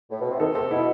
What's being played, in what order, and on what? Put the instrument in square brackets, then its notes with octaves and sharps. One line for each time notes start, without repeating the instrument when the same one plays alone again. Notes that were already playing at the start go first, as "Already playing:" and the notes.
[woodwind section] A2
B2
C3
[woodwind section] D#3 [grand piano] A4
[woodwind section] C3 [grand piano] A4
[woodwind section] B2 [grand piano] E4